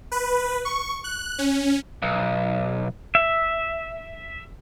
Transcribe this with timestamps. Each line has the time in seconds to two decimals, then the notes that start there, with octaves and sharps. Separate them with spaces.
0.12 B4
0.65 C#6
1.04 F#6
1.38 C#4
2.02 B1
3.15 E5